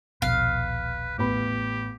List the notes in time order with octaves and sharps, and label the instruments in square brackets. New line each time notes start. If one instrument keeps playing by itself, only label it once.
[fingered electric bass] D#1 A#1 B2 [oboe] B4 [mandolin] F5
[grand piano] A1 B3 B5 [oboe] G4